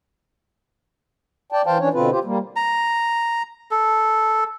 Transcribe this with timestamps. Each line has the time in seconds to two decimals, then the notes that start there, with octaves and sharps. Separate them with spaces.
1.52 D5 G5 A5
1.66 E3 C5 F5 G5 A5
1.79 E3 C#4 D4 C#5
1.93 B2 D3 C4 F4 B4
2.11 F4 G4 C5
2.25 G3 A#3
2.56 A#5
3.71 A4